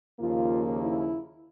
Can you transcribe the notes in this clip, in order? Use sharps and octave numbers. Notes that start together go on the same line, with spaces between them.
D#2 C#3 F3 A#3 F4
E4